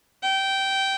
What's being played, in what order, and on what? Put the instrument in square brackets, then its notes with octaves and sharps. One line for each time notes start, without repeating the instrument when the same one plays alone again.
[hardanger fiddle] G5